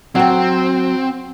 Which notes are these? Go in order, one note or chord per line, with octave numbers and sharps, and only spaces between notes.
F#3 C4 G5